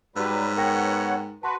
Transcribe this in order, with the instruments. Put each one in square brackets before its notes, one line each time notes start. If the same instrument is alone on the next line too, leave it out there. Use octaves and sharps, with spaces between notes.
[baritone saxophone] G#2 [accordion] F#3 G3 B4
[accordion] B3 C#5 F#5 [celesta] A#4 G5 A#6
[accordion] F#4 B4 [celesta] A5 C6